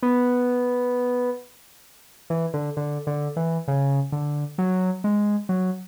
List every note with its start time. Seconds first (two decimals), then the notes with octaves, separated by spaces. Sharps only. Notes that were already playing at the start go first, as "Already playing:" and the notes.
0.03 B3
2.30 E3
2.54 D3
2.77 D3
3.07 D3
3.36 E3
3.68 C#3
4.12 D3
4.58 F#3
5.04 G#3
5.49 F#3